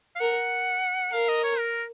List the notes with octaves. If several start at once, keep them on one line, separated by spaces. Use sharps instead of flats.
F5
A#4 F#5
A#4 F5
D#5
C#5
A#4